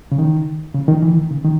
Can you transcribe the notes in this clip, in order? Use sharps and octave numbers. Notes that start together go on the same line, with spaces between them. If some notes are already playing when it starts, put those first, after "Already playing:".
C#3
D#3
C#3
D#3
E3
D#3
C#3
D#3